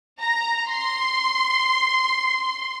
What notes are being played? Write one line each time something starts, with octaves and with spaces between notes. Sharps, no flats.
A#5
C6